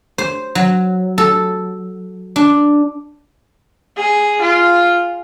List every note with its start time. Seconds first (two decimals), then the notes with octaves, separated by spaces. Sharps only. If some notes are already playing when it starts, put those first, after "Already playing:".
0.18 C5
0.55 F#3
1.18 A4
2.36 D4
3.97 G#4
4.41 F4